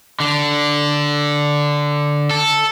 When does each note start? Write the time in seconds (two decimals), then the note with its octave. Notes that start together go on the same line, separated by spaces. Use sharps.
0.20 D3
2.31 A4